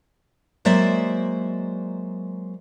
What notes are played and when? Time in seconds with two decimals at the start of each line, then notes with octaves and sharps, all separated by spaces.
0.65 F#3 G#3 A#3 C5 D5 E5